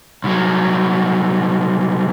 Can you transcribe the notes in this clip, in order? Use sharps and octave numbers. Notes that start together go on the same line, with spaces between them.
C2 F#3